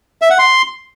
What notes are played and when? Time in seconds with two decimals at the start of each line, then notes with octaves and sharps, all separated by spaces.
0.22 E5
0.30 F#5
0.39 C6